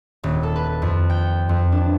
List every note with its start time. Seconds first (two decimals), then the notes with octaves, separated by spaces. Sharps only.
0.24 D#1
0.43 A4
0.56 B4
0.82 F2
1.10 G5
1.49 F2
1.72 D4